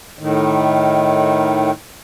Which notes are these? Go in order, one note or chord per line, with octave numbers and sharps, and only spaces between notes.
A2 D#3